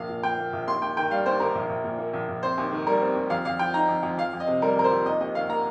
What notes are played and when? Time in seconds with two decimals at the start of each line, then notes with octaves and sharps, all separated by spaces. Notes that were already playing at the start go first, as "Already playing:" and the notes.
Already playing: A#1 A#3 F5
0.09 A#2
0.23 F3 G5
0.38 A#3
0.53 A#1
0.67 D#2 C6
0.82 D#2 G5
0.97 D#3 G5
1.11 G3 F5
1.26 D#2 C5
1.40 D#2 A#4
1.55 A#1
1.69 A#1
1.84 A#2
1.99 A#3
2.13 A#1
2.28 A#1
2.43 C4 C5
2.58 D#2
2.72 D#3
2.87 G3 A#4
3.02 C4
3.16 D#2
3.30 F2 F5
3.45 F2 F5
3.59 F3 G5
3.74 D#4 A#5
3.89 F2
4.03 F2
4.18 F2 F5
4.33 F2
4.40 D#5
4.47 C3
4.62 G3 A#4
4.77 F2 A#4
4.84 C5
4.91 F2
5.05 D#2 D#5
5.20 D#2 D#5
5.35 D#3 F5
5.50 A#3 A#5